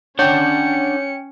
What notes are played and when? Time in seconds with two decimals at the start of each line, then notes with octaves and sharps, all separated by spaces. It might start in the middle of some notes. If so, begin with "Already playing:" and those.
0.19 C#4 D4 C#5 F#5 G5 G6 C#7